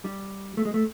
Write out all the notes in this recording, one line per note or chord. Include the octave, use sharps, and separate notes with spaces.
G3
A3
G#3
A3